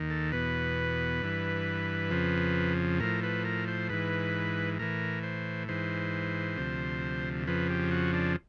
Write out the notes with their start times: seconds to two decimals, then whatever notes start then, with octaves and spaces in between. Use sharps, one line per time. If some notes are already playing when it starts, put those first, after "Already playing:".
Already playing: D#2 D#3
0.10 A4
0.32 E2 B2 B4
1.22 G2 E3
2.11 F2 C#3 F3
3.00 A2 F3 A#4
3.23 B4
3.44 A#4
3.68 C5
3.89 G#2 E3 B4
4.79 A2 E3 A#4
5.23 C5
5.69 G#2 E3 C5
6.57 D2 C3 F3
7.47 F2 C#3 F3 B4
7.70 G4
7.91 F#4
8.13 D4